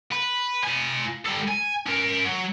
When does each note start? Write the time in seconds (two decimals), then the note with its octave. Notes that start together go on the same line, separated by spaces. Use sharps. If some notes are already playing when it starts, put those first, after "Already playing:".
0.12 B4
0.64 F4 G#5
1.26 G3 A4
1.49 G#5
1.86 C#4 A#4
2.25 F#3